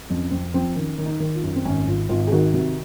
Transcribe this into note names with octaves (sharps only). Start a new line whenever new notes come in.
F2 C#4
F2 C4
F3 C4
D#3 C#4
D#3
D#4
D#3
F4
F#2
C4
G#1 C#4
G#1 F4
G#1 F4
G#4
D#3 F#4
C3 F#4